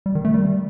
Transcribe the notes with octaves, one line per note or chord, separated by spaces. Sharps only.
G3
D#3
A3
G3